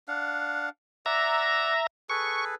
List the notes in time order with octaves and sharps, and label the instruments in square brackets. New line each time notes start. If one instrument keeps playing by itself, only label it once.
[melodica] D4 F5 F#5
[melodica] D5 F#5 [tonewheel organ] E5 A#5
[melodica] G#4 A4 B4 [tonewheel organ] C#6